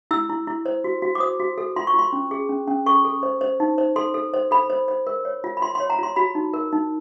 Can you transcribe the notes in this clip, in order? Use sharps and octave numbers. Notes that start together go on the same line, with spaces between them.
E4 E6
E4
E4
C5
F#4
F#4
D6
C5 D#6
F#4
A4
F4 C6
C#6
F4 C6
C#4
G#4
C#4
C#4
A4 C#6
A4
C5
C5
D#4
C5
A4 C6
A4
C5
A4 B5
C5
C5
A#4
C#5
F4
B5
F4 C6
C#5 C6
A#5
F4 C6
F#4 B5
D#4
A#4
D#4